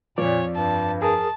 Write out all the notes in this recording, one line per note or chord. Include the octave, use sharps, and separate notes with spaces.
F2 A#2 F3 C#5 D5
G2 A5
G#4 A#4 A5 D#6